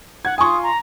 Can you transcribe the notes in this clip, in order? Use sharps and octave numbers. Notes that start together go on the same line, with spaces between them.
F#5 G#6
F4 G#5 C6 C#6 D#6
A#5